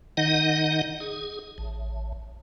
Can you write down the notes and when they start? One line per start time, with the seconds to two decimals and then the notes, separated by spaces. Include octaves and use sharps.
0.17 D#3 D#4 D#5 F#5
1.00 G#4
1.58 A1